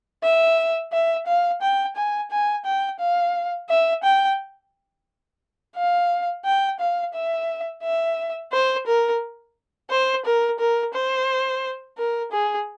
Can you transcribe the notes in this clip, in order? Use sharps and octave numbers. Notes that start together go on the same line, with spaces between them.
E5
E5
F5
G5
G#5
G#5
G5
F5
E5
G5
F5
G5
F5
E5
E5
C5
A#4
C5
A#4
A#4
C5
A#4
G#4